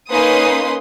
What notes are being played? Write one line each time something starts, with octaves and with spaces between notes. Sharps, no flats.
A#3 C#4 D#4 B4 C6 D#6